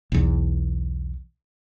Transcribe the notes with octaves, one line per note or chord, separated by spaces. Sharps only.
B1 E2